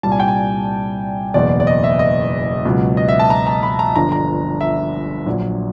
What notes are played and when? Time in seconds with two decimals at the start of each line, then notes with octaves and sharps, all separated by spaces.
0.03 C2 A#2 G3 A5
0.12 G#5
0.20 G5
0.28 G#5
1.34 F#1 E2 B2 D5
1.60 D5
1.67 D#5
1.84 E5
1.99 D#5
2.65 C#2 B2 F#3
2.97 D#5
3.08 E5
3.19 A5
3.30 A#5
3.47 A#5
3.63 B5
3.79 A#5
3.96 G1 G2 D3 F3 A#5
4.12 A#5
4.61 E5
5.26 A#1 A#2 F#3